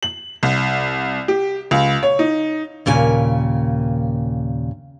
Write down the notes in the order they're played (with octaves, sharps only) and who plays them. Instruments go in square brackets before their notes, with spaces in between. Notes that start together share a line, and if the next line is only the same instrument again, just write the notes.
[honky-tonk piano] F#7
C2
G4
C#2
C#5
D#4
[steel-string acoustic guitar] D#2 A#2 C#3 G#5